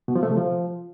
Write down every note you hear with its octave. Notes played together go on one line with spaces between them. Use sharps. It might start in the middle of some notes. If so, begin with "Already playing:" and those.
B2
F3
A3
C3
F3